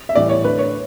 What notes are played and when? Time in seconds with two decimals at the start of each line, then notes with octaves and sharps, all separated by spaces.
0.09 E5
0.15 A2 E3 G3 D5
0.29 C#5
0.44 D3 A3 B4
0.59 C#5